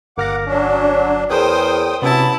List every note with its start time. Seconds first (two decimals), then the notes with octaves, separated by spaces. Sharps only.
0.18 G1 A#3 F#5 D6 F6 A#6
0.47 F#3 C#4 D4
1.30 E2 G#4 A#4 C5 C#5 G5 D#6
2.02 C3 F#3 B3 C#4 E4 A5